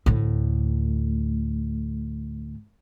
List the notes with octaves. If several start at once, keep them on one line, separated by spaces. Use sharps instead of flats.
D2 A2